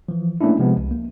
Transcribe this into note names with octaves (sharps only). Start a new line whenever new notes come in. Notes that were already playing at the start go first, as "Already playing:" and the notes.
E3 F3
A3 A#3 C#4 D4 E4
C3 F3 G#3 B3
C2
A#3